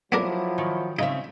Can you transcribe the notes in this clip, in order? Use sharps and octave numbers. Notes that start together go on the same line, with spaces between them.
F3 F#3 B3 D4 E4 A#4
D#3
C#3 C4 D#4 E5